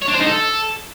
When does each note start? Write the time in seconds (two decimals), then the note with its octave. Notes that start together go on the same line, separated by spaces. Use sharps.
0.02 C#5
0.08 D4
0.14 C5
0.20 D#4
0.26 A4